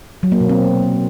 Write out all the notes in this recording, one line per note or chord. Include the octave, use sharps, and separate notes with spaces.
F#3
A#3
B2
C4